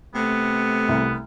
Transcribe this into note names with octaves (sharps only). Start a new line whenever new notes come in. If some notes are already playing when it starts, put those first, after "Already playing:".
C3 A3 B3
C2